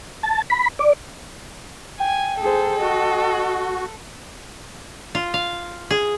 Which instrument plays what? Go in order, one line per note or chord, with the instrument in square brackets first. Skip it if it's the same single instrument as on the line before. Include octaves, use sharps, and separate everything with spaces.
[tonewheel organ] A5
B5
D5
[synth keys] G5 [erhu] G#5
[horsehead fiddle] G#4 C5 [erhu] A4
[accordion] F#4 [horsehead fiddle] D#5
[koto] F4
F5
G#4